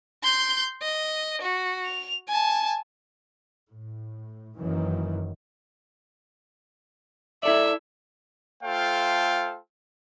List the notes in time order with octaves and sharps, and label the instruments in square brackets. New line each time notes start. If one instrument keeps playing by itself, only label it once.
[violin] C6 G6
D#5
F#4
F7
G#5 A5
[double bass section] A2
F#1 F#2 D#3 E3
[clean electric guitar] E4 A4 D5 [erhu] E5
[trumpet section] A3 F4 A4 C5 F5 G5